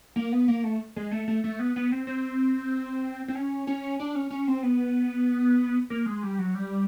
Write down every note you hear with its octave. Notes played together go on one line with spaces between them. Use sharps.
A#3
B3
A#3
A3
G#3
A3
A3
A3
B3
B3
C4
C4
C4
C#4
C#4
D4
C#4
C#4
C4
B3
A#3
G#3
G3
F#3
G3